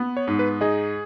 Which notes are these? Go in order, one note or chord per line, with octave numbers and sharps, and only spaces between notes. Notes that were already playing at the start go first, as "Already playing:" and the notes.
Already playing: B3
C#5
G#2
B4
D#4 G#4